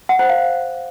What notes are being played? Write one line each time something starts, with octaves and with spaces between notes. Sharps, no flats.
F#5
C5
F5